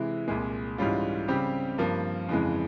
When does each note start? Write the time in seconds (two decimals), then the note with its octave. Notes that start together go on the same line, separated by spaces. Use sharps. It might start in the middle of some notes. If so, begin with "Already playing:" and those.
Already playing: C3 E3 G#3 E4
0.28 C2 A#2 G#3
0.78 G#2 E3 G3 C#4 F4
1.28 C#3 G3 C4 G4
1.78 G2 F3 A#3
2.29 F2 C#3 E3 G#3